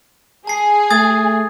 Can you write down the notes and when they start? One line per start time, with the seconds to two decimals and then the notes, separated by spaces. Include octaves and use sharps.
0.47 G#4 A5 C7
0.90 A3 D#6 G#6 A6